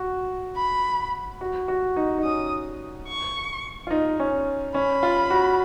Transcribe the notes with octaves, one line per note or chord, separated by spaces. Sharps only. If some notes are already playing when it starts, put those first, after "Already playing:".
Already playing: F#4
B5
F#4
F#4
D#4
D#4
C#4 D#6
C#6
F4
D#4
C#4
C#4 B5
F4
F#4